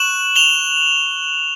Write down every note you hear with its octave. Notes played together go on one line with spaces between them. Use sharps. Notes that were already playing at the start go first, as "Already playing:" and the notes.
Already playing: C#6 F#6 E7 F#7
F7 G7